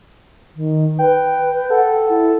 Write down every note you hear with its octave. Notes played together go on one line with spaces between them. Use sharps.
D#3
B4 G5
A4 F#5
E4